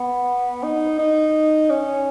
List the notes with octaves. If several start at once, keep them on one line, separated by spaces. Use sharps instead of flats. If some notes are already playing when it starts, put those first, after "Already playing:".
Already playing: B3
D#4
D#4
C#4